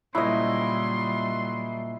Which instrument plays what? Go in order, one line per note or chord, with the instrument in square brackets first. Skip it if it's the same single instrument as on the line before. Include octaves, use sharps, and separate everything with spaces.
[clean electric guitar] A#2 C#3 F#3 [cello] G3 [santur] E4 D#5 [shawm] C6